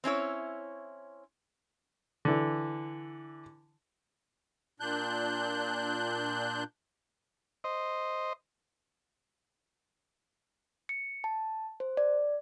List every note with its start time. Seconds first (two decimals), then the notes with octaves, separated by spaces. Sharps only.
0.04 C4 C#4 E4 C#5
2.25 D3 E3
4.80 A#2 D4 F#6 G6
7.64 C5 D#5
10.89 C#7
11.24 A5
11.80 C5
11.97 D5